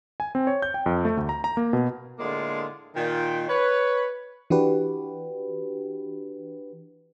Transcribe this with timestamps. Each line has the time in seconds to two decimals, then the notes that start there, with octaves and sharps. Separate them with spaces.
0.20 G#5
0.35 C4
0.47 C#5
0.62 G6
0.74 G5
0.86 F2
1.05 A3
1.17 D2
1.29 A#5
1.44 A#5
1.57 A#3
1.73 B2
2.19 A2 D3 G#3 A#3 F4
2.95 A#2 D#3 G5
3.48 B4 C#5
4.50 E3 D4 F#4 G4 B4